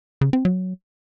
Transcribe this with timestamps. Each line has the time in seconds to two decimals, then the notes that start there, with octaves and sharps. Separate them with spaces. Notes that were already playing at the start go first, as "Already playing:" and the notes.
0.21 C#3
0.33 C4
0.45 F#3